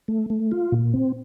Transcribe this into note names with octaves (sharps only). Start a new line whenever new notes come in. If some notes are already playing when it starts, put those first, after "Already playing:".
A3
A3
F4
A#2
C4